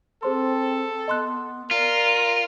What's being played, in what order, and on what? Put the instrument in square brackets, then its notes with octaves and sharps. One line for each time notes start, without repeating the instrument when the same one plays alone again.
[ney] C4 [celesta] G#4 C5 C6 [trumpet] A4
[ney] B3 [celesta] D#5 C6 F#6
[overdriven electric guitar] F4 [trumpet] A#4 [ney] D5